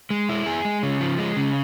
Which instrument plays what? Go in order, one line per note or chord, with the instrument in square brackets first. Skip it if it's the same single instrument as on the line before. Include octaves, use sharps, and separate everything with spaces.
[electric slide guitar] G#3
E4
G#4
G#3
C#3
F3
G#3
C#3